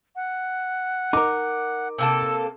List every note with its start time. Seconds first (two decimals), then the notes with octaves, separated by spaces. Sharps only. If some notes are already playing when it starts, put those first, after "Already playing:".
0.16 F#5
1.13 D#4 A#4 D6
1.98 C3 A#3 A4 E6